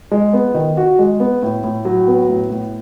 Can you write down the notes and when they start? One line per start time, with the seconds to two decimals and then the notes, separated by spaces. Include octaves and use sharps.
0.11 G#3
0.33 B3
0.54 D#3
0.77 F#4
0.99 G#3
1.20 B3
1.43 A2
1.64 A2
1.85 F#3
2.08 B3
2.29 A2
2.51 A2